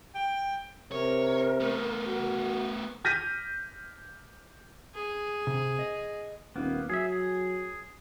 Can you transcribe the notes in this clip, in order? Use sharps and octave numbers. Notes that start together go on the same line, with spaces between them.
G5
C3 A#4 C#5
A3 B3
F#4
F6 G6 A#6 B6 D#7
G#4
C3
D#5
D#1 A#3 B3
F#3 G#4 E5
G#4